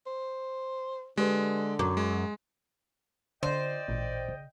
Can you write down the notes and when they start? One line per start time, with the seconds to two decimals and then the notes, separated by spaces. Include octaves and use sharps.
0.06 C5
1.17 D3 G#3 G4 G#4 B4
1.79 F#2 D6
1.97 G#3
3.43 D3 C#4 F4 C5 D5 D#5 G5
3.88 A1 A#2
4.28 C#3